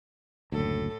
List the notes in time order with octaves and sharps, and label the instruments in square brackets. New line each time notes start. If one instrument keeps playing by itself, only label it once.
[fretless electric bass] F#1 D2 [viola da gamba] A2 A4